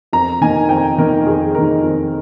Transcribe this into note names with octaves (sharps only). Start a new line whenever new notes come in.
F2 A#5
D#3 A#3 D#4 G#5
F2 G5
D#3 A#3 D#4 A#4
F2 G#4
D#3 A#3 D#4 A#4
F2